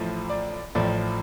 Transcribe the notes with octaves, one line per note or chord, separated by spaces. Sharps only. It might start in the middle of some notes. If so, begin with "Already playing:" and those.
Already playing: A1 A2 F3
D5
A1 A2 F3 D5